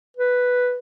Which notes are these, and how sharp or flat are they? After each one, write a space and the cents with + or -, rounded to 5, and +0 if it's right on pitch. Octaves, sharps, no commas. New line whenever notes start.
B4 +0